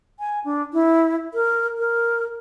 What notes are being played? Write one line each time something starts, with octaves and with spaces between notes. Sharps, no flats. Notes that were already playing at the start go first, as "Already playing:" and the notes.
G#5
D4
E4
A#4
A#4